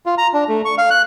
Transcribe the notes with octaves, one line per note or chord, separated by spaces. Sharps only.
F4
A#5
D4
A3
C#6
F5
F#6